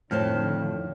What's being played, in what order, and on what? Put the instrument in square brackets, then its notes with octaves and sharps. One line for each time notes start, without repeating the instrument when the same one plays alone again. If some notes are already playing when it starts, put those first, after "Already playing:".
[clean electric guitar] F2 [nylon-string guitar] A2 C5 A5 [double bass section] D3 D#3 [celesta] C#5 F6